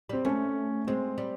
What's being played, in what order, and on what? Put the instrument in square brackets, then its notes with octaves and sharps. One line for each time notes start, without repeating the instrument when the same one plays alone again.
[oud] G3 [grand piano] C4
[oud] A3 [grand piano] C#4
[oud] G#3 [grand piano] C4
[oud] G3